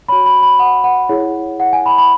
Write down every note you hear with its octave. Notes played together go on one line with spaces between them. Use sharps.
F#4 C#5 B5
B5
B5
F#5
F#5
E4 G#4 C#5
F#5
G#5
B5
B5